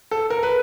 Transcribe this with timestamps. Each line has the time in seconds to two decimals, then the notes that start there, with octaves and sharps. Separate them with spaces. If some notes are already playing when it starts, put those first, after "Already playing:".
0.11 A4
0.30 A#4
0.43 B4